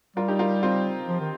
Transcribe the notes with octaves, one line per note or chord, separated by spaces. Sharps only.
G3 F4 A#4
D#4 G4
F4 A#4
C4 F4
F3
D#3